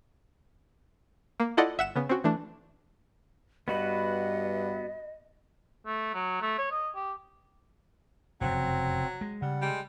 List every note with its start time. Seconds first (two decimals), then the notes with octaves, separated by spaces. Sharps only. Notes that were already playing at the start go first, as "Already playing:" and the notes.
1.40 A#3
1.57 E4 F4 A4 D5 D#5 F#5
1.78 G1 E5 F#5 E7
1.96 C#3 B3
2.09 C4 C#4 F#4
2.24 E3 A3 D4
3.68 G2 B3 F#4 B4 D#5
5.86 A3
6.13 F#3
6.42 A3
6.58 C#5
6.71 D#5
6.95 G4
8.41 F1 F#2 C#3 F#3 C4
9.21 G#3
9.42 C#3 G3 F#5
9.62 G3 G#3